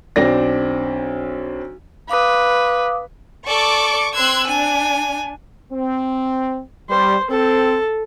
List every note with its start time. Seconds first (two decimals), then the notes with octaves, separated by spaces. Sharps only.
0.16 B1 C4 D4 A#6
2.10 B4 F5 D6 D#6
3.47 A4 D5 C#6 D6
4.14 C4 C6 E6 F#6 G#6
4.47 D4 G#5
5.72 C4
6.89 G3 C5
7.30 C4 A4